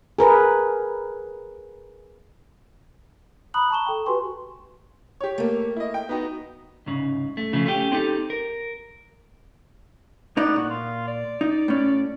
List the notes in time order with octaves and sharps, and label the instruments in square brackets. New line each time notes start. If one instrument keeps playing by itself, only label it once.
[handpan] G#4 A#4 B4
[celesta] A#5 B5 D#6 F#6 F#7
A5 A#5 C#6 E7 G7
A4 G5
F#4 G4 B4 G#5 C6 C#6
[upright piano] G4 C#5
[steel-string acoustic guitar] A3 A#3
[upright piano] E4 D#5
G5
B3 D#4 F#4
[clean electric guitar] C2 G#2 C#3
A3
C#3 F3 A3
A3 C#4 G4
C4 D#4 G4 A4
A#4
[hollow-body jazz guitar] A2 D#4 D5 [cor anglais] B3
[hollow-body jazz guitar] A#2 [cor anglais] F#4
[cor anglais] F4
D5
[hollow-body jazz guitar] D#4
A2 C#4